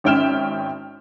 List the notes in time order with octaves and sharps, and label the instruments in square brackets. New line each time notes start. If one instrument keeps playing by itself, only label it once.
[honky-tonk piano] G#1 C#4 E5 G5 F6 E7